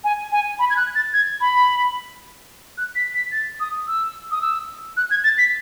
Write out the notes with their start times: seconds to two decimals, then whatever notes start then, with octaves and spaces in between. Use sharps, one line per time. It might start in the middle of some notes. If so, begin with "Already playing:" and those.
0.04 G#5
0.32 G#5
0.59 B5
0.70 G#6
0.77 F#6
0.95 A6
1.13 G#6
1.41 B5
2.78 F#6
2.96 B6
3.15 B6
3.32 A6
3.60 D#6
3.88 E6
4.31 D#6
4.42 E6
4.97 F#6
5.11 G#6
5.24 A6
5.38 B6